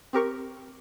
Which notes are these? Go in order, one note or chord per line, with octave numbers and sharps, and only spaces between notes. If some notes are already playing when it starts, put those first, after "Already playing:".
C4 G4 A#4 C#6